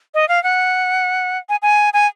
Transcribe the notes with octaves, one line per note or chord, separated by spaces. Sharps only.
D#5
F5
F#5
G#5
G#5
G#5